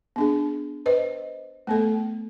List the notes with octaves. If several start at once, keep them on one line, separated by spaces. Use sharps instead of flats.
B3 D4 G#4
B4 C5 D#5
A3 B3 A4